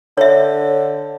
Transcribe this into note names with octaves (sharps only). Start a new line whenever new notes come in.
D3 C#5 E5